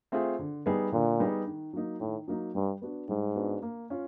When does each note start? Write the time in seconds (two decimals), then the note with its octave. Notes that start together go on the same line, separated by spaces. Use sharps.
0.12 A3 C4 F4 G#4
0.39 D3
0.66 G3 B3 D#4 G#4
0.92 A#2 D3
1.20 G3 B3 D#4 G#4
1.47 D#3
1.73 F#3 A#3 D#4
2.00 A2 D#3
2.28 F#3 A#3 D#4
2.55 G2 G3
2.82 B3 D4 F#4
3.09 G#2 G3
3.36 B3 D4 F#4
3.62 A#3
3.90 C#4 F4